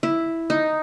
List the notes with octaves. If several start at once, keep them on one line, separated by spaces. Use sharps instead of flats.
E4
D#4